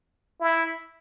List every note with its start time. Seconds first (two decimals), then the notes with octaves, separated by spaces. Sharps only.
0.41 E4